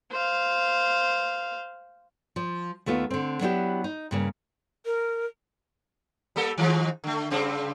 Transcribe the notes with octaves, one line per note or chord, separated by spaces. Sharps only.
C5 F5
F3
D#2 A3 B3 F4
D3 C4
F#3 B3 D4 E4 F4 G4
D#4
G2 C#3 A#3
A#4
G3 A#3 A4
D#3 F3 G#3
D3 A3
G2 C#3 C4